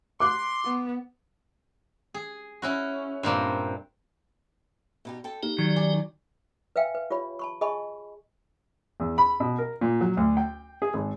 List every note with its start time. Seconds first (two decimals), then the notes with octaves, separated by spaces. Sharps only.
0.20 C6 D6 F#6
0.65 B3
2.14 G#4
2.62 C#4 E4 F#4
3.23 G2 A#2 A#3 C4
5.05 B2 D#4 G4
5.24 A4 G5 A5
5.43 A#3 D#4 G4
5.58 D#3 F#3 D5
5.76 C#3 D5 G#5
6.76 B4 E5 F5 G5 G#5
6.95 B4
7.10 F4 G4 C#5 B5
7.39 A5 B5 C#6
7.61 G#4 D#5 G#5 A5 B5 C#6
9.00 E2
9.18 B5
9.40 B2
9.58 A#4
9.81 A#2
10.01 F#3
10.17 D2
10.37 G5
10.82 G#4
10.94 G#1